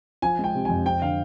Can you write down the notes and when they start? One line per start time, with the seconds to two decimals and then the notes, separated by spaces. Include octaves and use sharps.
0.22 F3 G#5
0.39 G#3
0.44 G5
0.55 C3
0.65 F2 G#5
0.86 C4 G5
1.02 D3 F5